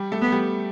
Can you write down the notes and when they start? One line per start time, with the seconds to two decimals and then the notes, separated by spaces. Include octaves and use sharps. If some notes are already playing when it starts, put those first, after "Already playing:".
Already playing: G3 G4
0.12 A3 A4
0.22 B3
0.32 G3 G4